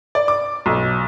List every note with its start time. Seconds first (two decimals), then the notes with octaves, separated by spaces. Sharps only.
0.15 D5
0.28 D6
0.66 B1